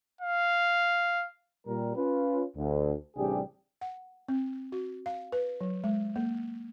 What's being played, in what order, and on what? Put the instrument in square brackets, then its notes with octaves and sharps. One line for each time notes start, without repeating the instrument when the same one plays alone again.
[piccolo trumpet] F5
[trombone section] A#2 G3 A#4
C#4 F4 B4
D2
A1 C3 G3 D4 G4 G#4
[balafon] F#5
C4
F#4
F5
B4
F#3
G#3
A#3